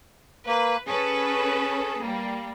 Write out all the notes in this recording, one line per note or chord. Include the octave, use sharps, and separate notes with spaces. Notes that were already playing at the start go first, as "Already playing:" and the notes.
A#3 B4
C#4 G#4 A4 B4
G3 A#3